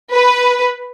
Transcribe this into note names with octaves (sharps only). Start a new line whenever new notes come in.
B4